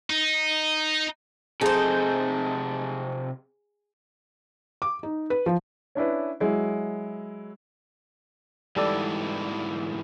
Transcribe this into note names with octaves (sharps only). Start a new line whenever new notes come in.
D#4
C3 D#4 G#4 A4 C5
D6
D#4
B4
F3
C#4 D4 E4 B4
F#3 G#3 E4
G#2 E3 G3 A4 D5